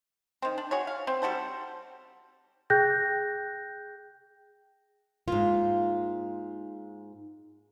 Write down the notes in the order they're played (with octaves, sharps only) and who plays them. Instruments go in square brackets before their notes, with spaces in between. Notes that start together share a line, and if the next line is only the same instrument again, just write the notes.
[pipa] D#3 C4
D4
F#4 G#4 C#5
F5
C4
G3 F#4 A4 C5
[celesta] G#4 G5 F#6 G6 A#6
[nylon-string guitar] G#2 F4 [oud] A#3